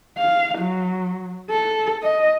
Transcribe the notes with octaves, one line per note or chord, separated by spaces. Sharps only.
F5
F#3
A4
D#5